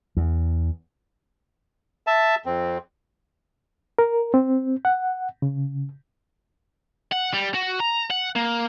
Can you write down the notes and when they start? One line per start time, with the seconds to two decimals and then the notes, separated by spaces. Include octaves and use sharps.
0.17 E2
2.07 E5 A5
2.46 F2 C4
3.99 A#4
4.34 C4
4.85 F#5
5.42 C#3
7.12 F#5
7.33 G3
7.55 F#4
7.80 A#5
8.11 F#5
8.36 A#3